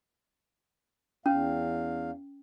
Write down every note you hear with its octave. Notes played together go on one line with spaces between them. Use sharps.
E2 C#4 F5